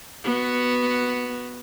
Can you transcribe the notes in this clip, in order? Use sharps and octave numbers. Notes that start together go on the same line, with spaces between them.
B3 F#4